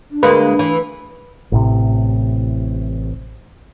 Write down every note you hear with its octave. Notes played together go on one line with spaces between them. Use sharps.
D4
D2 G#3 A#3 B4
E3
A1 A2 C3